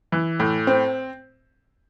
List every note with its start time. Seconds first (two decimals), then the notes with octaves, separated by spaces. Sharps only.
0.12 E3
0.40 A2
0.67 C4